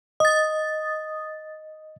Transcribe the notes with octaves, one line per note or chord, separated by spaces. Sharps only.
D#5 D#6 A6